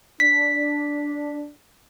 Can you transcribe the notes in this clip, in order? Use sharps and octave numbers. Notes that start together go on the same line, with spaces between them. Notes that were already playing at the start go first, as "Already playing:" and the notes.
D4 B6